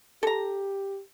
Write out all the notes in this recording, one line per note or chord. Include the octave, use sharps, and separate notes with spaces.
G4 A4 A#5